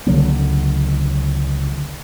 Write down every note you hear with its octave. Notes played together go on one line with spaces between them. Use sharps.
C#2 D3 F#3 A#3